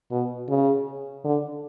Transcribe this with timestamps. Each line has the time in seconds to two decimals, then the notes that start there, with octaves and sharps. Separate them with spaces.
0.11 B2
0.49 C#3
1.25 D3